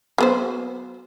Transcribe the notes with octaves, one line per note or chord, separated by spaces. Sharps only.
F#3 B3 C5